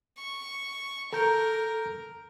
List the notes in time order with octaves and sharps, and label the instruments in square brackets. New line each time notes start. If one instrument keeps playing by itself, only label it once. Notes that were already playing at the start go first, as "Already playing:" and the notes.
[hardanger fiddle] C#6
[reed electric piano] A4 A#5 G6 [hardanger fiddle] A#4